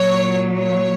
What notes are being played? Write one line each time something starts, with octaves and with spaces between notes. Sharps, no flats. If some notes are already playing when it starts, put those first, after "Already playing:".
Already playing: A#2 F#3 C#5
C#5